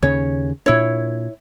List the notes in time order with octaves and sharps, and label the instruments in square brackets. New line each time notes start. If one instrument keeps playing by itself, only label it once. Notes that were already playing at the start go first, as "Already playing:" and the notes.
[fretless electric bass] D#2 C#3 C#4 [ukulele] C#5
[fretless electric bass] A#2 D4 [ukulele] E4 C#5